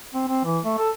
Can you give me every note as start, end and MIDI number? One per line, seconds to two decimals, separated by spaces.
0.14 0.24 60
0.28 0.43 60
0.45 0.59 52
0.65 0.75 57
0.79 0.90 69